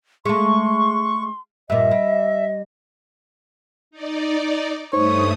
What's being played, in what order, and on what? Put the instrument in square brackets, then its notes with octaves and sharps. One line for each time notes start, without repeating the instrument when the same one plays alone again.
[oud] G#3 A3 [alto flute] C6 [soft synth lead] C#6
[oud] G2 A#2 [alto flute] D#5 [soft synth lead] E5
[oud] G3
[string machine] D#4 D5
[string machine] G2 A3 D#6 [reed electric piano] D#4 C5 [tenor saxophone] C#5